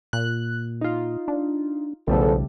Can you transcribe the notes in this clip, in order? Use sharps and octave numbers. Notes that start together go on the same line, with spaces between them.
A#2 F#6
D#4 F4
D4
B1 E2 C#3 F3 G3 A3 A4